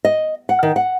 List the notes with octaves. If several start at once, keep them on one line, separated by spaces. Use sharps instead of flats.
D#5
F#5
D#3
F#5